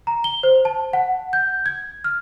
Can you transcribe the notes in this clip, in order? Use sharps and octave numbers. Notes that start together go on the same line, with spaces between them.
A#5
G7
C5
A5
F#5
G6
G#6
F6